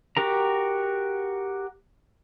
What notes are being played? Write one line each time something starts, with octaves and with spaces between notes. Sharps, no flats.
F#4 G4 A#4 A#5